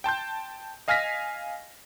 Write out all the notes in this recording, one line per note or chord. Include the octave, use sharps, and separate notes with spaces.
G5 A5 C6 G6
D#5 F5 G#5 F6 A#6 B6